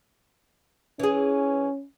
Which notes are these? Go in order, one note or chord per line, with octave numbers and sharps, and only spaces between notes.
E3 C#4 G#4